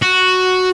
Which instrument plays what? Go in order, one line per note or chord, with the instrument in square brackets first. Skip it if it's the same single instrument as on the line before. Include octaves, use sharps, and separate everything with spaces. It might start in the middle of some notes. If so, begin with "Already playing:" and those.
[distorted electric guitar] F#4